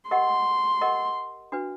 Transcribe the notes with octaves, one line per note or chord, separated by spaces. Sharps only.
G4 A#4 D#5 F#5 C6
G4 A#4 D#5 F#5
D4 F#4 B4